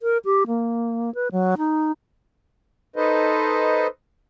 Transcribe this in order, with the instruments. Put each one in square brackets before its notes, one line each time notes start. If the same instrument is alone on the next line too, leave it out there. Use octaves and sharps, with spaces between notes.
[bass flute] A#4
G4
A#3
B4
F#3
D#4
[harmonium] D#4 A4 B4 C5 D#5